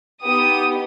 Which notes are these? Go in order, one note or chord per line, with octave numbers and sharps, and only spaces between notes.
B3 D#4 G4 D#6